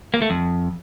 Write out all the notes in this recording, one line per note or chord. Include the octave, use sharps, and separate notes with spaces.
A#3
A3
F2